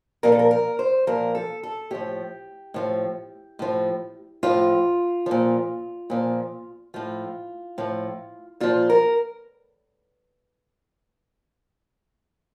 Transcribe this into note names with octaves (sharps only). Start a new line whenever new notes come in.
A#2 F3 A#4
A4
A#4
A#4
C5
A#2 F3 A#4
A4
A4
A2 F3 G4
A2 F3
A2 F3
A2 F3 F4
A#2 F3
A#2 F3
A2 F3 F4
A2 F3
A#2 F3 F4
A#4